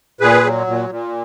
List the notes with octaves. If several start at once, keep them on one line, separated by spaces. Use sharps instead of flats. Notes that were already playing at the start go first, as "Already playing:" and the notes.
A#2 G#4 B4
F#3
A#2
A#2